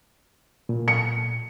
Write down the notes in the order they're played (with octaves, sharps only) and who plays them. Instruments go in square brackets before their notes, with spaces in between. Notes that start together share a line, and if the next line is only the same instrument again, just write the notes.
[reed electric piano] A#2
[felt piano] C#7